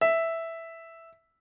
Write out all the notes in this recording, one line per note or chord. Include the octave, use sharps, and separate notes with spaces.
E5